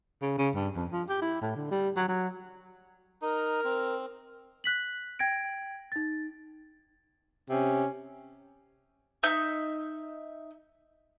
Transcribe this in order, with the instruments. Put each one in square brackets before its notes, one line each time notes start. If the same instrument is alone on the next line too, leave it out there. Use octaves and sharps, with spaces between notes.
[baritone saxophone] C#3
C#3
G2
F2
F3
G4
E4
A2
D3
G3
F#3
F#3
[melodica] D#4 [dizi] A#4
[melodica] C4
[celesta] F#6 B6 F#7
G5 G#6 A#6 D7
D#4 A6
[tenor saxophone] C3 [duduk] C#4
[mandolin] D#4 E5 G6